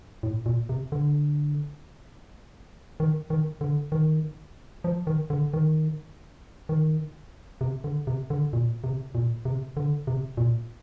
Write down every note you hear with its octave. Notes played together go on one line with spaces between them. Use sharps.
A2
A#2
C3
D3
D#3
D#3
D3
D#3
F3
D#3
D3
D#3
D#3
C3
D3
C3
D3
A#2
C3
A#2
C3
D3
C3
A#2